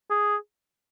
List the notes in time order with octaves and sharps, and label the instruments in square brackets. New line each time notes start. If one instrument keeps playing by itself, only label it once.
[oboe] G#4